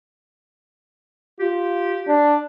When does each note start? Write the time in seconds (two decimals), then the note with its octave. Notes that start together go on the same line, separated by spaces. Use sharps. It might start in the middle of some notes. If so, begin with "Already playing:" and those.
1.40 F4 G4
2.07 D4